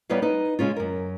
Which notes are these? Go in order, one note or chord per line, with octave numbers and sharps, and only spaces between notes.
G3 B3 D#4 B4 C#5 F5
D#4 B4
C#3 G#3 C#4 F4
F#2 A#4